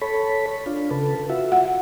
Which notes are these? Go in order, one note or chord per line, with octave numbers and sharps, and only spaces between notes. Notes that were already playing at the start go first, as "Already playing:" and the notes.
A4 C#5 B5
D4 F4
C#3 A4 B4
F4 F#4 E5
F#5